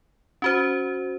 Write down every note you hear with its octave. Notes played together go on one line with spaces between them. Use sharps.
C#4 F#4 C5